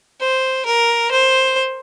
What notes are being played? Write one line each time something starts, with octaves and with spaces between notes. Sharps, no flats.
C5
A#4
C5